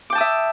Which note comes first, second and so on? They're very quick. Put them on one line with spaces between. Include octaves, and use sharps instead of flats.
D6 G5 A5 D#6 E5